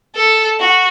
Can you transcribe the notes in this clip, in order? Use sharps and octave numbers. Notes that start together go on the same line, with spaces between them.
A4
F#4